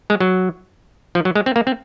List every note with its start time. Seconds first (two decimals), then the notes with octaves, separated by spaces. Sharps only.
0.10 G#3
0.20 F#3
1.15 F3
1.25 F#3
1.35 G#3
1.46 C4
1.56 A#3
1.67 C4